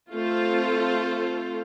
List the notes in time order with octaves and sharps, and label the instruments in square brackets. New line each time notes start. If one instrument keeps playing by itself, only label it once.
[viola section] A3 C4 F4 A4 C5